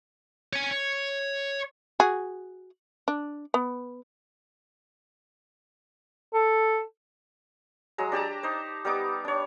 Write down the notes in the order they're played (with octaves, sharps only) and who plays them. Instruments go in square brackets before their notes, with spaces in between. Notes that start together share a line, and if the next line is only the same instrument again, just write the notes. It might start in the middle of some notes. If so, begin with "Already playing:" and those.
[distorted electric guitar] C#5 G#5
C#5
[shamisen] F#4 G#4
D4
B3
[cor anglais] A4
[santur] F#3 G#3 A#5
D4 G4 A5 A#5
D#4 C5
G3 B3 D#4 D6
D4 C#5